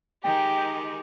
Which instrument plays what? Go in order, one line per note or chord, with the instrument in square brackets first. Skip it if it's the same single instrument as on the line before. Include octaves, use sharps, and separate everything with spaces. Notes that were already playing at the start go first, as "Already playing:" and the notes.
[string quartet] D#3 G#3 D#4 [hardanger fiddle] G4 [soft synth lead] G5